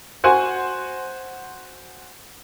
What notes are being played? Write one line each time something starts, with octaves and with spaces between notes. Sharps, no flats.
F#4 C5 F#5 G#5